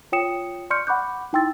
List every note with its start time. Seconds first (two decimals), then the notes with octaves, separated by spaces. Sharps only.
0.12 F4 C#5 G5 D#6 C#7 E7
0.70 D5 C6 C#6 F6 G6 C#7
0.87 F#5 B5 C#6 D6 F#6 G6
1.33 D#4 E4 G5 C6 E6 A6